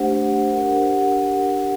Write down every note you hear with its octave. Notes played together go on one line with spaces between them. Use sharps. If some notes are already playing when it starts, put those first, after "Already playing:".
Already playing: A3 D4 G4 C5 F#5
D4 G4 A#4 F#5